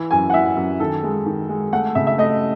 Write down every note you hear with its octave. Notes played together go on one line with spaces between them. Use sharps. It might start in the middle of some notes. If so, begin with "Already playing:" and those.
Already playing: E3
F#2 G#5
F#5
E3 E5
F#2
D#3 A4
G#3
D#3
G#3
A3 F#5
C#3 E5
E5
A3 D#5